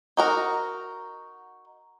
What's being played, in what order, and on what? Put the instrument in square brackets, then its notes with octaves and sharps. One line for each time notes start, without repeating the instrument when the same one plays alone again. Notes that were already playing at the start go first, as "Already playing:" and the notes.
[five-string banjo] D#4 F#4 A#4